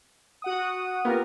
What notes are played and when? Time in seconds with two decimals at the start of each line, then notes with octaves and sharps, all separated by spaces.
0.42 F#4 F#5 D#6
1.05 B3 F4 G4 A#4